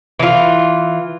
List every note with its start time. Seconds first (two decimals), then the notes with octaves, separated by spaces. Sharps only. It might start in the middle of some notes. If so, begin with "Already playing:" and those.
0.19 E3 F4